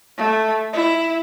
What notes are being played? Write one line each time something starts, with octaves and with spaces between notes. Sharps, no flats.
A3
E4